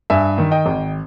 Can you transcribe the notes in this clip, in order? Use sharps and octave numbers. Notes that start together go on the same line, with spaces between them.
G2 E5 G#5
D#3
D#5 G5
G#1